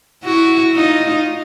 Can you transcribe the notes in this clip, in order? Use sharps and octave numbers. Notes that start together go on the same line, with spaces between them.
E4 F#4
D#4 F4